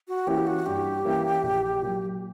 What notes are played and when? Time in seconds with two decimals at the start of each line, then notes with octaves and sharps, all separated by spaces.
0.08 F#4
0.27 E3 A#3 C#4 E4 G4
0.47 F#4
0.66 G2 G4
1.05 E3 A#3 C#4 E4
1.43 A#1
1.82 A#2 F#3